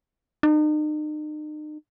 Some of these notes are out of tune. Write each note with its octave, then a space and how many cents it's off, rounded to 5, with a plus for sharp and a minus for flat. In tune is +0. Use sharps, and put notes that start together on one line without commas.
D#4 -40